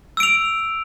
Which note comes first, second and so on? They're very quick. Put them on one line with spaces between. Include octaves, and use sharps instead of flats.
E6 D7 F7